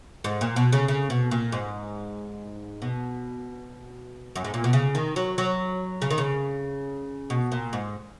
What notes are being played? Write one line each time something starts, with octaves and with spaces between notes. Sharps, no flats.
G#2
A#2
B2
C#3
C#3
B2
A#2
G#2
B2
F#2
G#2
A#2
B2
C#3
D#3
F#3
F#3
C#3
D#3
C#3
B2
A#2
G#2